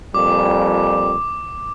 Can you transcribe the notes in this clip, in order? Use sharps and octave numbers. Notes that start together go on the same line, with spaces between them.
F2 A#2 G3 D6